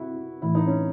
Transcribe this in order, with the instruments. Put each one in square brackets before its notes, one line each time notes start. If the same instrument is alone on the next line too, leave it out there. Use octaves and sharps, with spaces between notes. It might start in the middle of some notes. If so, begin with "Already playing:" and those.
Already playing: [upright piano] E4 F#4
[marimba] A2 E3 A3 [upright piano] E4
[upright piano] D#4
C#4